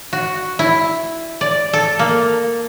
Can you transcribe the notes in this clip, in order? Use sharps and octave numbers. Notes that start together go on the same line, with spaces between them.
F#4
E4
D5
A4
A#3